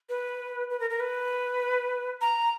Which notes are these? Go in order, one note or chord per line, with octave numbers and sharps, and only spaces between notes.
B4
B4
A#4
A#4
B4
A#5